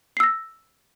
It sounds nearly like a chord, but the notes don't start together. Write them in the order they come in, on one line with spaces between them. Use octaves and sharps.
C7 E6 A#6